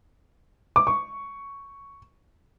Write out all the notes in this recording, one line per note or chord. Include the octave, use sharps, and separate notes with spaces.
D6
C#6